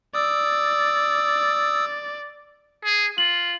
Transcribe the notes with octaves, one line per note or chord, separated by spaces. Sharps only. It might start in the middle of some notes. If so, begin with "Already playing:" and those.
D5 D#6 E6
G#4
F4 F#7